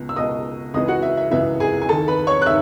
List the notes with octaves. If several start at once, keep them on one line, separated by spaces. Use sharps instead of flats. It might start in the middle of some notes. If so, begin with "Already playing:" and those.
Already playing: C#2 B2
E6
C#2 B2 D#5 D#6
C#2 C#3 E3 D#5 D#6
F#4 F#5
E5
E5
C#2 C#3 E3 E5
G#4 G#5
G#5
D#2 D#3 A4 A5
B4 B5
C#5 C#6
F#6
D#3 E5 E6